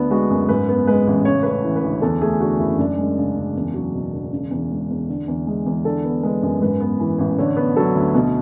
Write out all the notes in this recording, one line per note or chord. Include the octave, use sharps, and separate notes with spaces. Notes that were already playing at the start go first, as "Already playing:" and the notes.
Already playing: D2 D3 B3
G#3 F#4
F#2
G#2 B4
B3
G#3 B4
A1
C#3 C#5
A3 B4
C#5
E3
B4
D2
E2 A4
A3 G#4
D3 F#4
F#1 E4
F#2 D4
G#3
C#3
F#1
E2
F#3
B2
E1
C#3
E2
G#3
E2
D3
E2
G#3
E2
D3 A4
B3
G#3 B4
F#2
G#2 B4
B3
E3
A1
D3 C#5
B3
F#3 A4
D2
B2